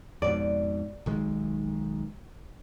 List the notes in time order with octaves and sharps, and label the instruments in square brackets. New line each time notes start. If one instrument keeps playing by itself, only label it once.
[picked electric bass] F2 G#2 B2 [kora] D5
[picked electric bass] B1 D#3 G#3